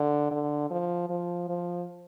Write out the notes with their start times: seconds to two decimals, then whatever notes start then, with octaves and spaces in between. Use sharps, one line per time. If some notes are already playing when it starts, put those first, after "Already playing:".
Already playing: D3
0.31 D3
0.70 F3
1.09 F3
1.49 F3